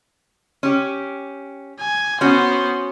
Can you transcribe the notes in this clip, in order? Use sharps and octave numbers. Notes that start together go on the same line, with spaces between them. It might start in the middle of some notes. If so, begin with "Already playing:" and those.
C#4 G4
G#5
B3 C#4 F#4 C5